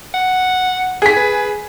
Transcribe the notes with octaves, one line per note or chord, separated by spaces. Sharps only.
F#5
G4 G#4 B6
B4